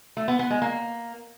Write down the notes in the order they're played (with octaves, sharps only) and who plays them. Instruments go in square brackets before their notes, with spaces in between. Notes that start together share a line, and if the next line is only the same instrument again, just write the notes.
[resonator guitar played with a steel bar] A3
B3
B3
G#3
A#3